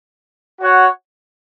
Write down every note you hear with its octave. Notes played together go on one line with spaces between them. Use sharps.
F#4 C#5 F#5